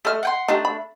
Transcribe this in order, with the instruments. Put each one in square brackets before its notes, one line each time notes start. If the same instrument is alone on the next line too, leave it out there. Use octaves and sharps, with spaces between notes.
[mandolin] A3 F6 [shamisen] A4 D#5 E5
[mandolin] F#5 G5 C6
[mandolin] A3 D4 [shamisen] D#4 F4 G4
[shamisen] B5